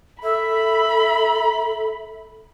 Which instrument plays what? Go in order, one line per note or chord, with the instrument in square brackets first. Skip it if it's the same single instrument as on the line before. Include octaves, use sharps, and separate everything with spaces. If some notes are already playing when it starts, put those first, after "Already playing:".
[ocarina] A4 [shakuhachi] E5 [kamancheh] B5